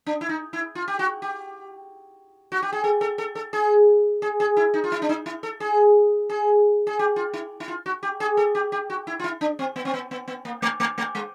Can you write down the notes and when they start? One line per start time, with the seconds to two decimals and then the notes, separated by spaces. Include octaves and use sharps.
0.06 D4
0.21 E4
0.29 D#4
0.53 E4
0.75 F4
0.88 G4
0.99 F#4
1.22 G4
2.52 F#4
2.62 G4
2.72 G#4
2.84 A4
3.01 A4
3.18 A4
3.35 A4
3.53 G#4
4.22 G#4
4.40 G#4
4.57 E4
4.74 D#4
4.84 F4
4.92 E4
5.02 D4
5.09 D#4
5.26 E4
5.43 A4
5.60 G#4
6.30 G#4
6.87 G#4
6.99 G4
7.16 F4
7.33 E4
7.60 E4
7.68 F4
7.86 F#4
8.03 G4
8.20 G#4
8.37 A4
8.55 G4
8.72 G4
8.90 F#4
9.07 E4
9.20 F4
9.24 E4
9.41 D4
9.59 C4
9.76 B3
9.85 C4
9.94 B3
10.11 B3
10.28 B3
10.45 A#3
10.62 A3
10.80 A3
10.98 A3
11.15 G#3